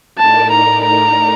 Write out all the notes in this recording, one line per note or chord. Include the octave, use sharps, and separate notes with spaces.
A2 A3 D#4 A#4 D5 A5
A#5
A#5